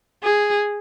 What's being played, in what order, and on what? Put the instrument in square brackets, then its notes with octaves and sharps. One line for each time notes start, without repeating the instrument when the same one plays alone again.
[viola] G#4